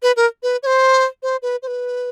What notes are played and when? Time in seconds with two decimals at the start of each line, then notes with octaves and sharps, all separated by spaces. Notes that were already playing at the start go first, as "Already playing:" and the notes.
0.03 B4
0.17 A#4
0.43 B4
0.63 C#5
0.66 C5
1.23 C5
1.42 B4
1.63 C5
1.67 B4